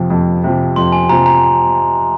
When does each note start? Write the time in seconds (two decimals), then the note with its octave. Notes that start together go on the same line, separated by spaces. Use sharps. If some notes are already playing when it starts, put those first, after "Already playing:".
Already playing: F2 C3 F3
0.10 F2
0.44 C3 F3
0.76 F2 C6
0.92 G#5
1.09 C3 F3 A#5
1.26 A#5